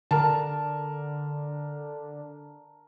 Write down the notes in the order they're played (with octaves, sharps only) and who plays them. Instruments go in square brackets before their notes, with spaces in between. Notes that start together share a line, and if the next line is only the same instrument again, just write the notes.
[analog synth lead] D3 [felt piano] A#4 A5